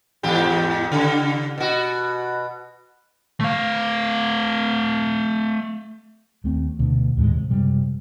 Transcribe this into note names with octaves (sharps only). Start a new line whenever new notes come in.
E2 G#2 G4
C#3
B2 F#4
A3 F5
D#2 A3 C4
D2 B2
D#2 A2 G#3
C3
F#2 C3 G3 G#3